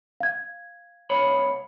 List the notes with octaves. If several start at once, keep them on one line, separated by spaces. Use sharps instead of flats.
F5 G#6
C2 C#5 B5